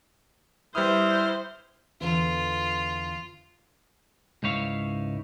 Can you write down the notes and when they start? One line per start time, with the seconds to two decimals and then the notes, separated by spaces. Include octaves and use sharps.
0.75 G3 E4 B4 C5 D#6 F6
2.01 E2 D3 F4
4.43 C#2 G#2 D#4 E4 C#5 F5